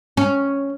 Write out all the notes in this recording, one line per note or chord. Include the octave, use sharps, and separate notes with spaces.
C#4